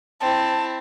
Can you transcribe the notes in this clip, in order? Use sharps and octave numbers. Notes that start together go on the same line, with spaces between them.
C4 E4 A5